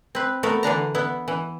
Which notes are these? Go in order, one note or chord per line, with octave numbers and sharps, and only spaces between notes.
C4 B4
A3 B3 F#4 A#4
D3 E3 D4 A#5
B3 E4
E3